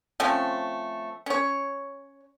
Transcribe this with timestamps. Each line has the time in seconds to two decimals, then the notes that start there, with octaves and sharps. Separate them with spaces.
0.20 F3 A3 C4 C#4
1.26 C#4 C#5